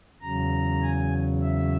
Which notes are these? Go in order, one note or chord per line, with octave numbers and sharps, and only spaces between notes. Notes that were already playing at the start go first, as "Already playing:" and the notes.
E2 C#3 F#3 A#5
G#5
E5